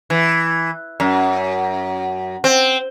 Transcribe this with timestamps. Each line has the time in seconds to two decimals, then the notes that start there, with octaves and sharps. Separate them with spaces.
0.10 E3
1.00 F#2
2.44 C4